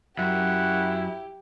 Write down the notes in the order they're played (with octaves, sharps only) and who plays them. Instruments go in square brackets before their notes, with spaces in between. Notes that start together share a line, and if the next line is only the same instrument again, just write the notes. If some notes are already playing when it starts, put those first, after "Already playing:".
[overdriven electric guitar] F#2 [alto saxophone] E4 [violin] G4 [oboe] F#5